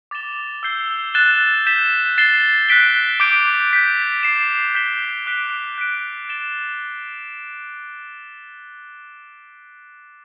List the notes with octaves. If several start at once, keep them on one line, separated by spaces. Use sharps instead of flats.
D6 A6 E7 G7
E6 G6 C7 G7
F#6 A6 E7 G7
G6 B6 E7 G7
A6 C7 E7 G7
F#6 B6 D7 G7
D6 G6 D7
G6 B6 D7
A6 C7 E7
G6 B6 E7 G7
D6 F#6 B6 D7 G7
F#6 B6 D7
A6 E7 G7